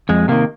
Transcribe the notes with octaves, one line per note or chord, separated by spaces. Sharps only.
F2 G#3
C3 D#3 A#3